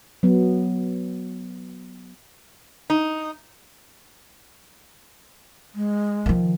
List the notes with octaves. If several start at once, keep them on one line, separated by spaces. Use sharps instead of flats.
F#3 B3
D#4
G#3
D#3 F3